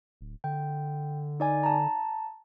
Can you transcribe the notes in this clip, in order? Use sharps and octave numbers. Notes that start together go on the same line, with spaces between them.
D1
D3 G5
D#4 D5 G#5
A5 A#5